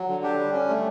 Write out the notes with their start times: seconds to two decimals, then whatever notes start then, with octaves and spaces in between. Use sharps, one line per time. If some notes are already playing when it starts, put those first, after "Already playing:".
Already playing: F#3
0.08 D3
0.23 D4 G4
0.39 G3
0.53 C#4
0.69 A3